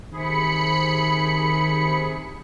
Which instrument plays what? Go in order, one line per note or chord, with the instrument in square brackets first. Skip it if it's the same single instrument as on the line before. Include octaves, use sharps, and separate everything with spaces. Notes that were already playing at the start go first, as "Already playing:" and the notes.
[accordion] C3 G#4 [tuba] D#3 [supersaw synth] B5 C#7